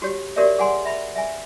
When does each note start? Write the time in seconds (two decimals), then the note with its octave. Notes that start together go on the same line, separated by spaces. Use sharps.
0.02 F#4 G4 C#5
0.36 F#4 G4 A#4 C#5 D5 E5
0.58 G#4 F#5 G#5 C6
0.85 E5 B5
1.16 E5 G#5